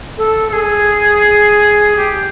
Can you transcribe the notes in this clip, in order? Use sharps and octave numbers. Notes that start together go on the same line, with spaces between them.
A4
A4
G#4
G4